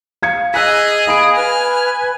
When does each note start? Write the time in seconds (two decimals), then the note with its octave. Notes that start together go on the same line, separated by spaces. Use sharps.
0.22 F5 G#6 C#7
0.54 G#4 D#5 G#5 E6 F#6 B6
1.07 F5 B5 D#6 D7
1.36 B4 F6